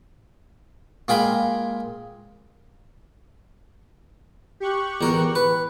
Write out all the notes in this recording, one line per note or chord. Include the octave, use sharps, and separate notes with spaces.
A#2 G#3 F5 G5 G#5 B5
G4 C#6 F#6
E2 A#4
B4